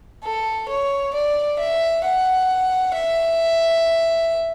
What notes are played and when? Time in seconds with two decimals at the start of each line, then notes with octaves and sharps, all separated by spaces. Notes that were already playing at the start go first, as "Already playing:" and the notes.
0.23 A4
0.69 C#5
1.14 D5
1.59 E5
2.04 F#5
2.94 E5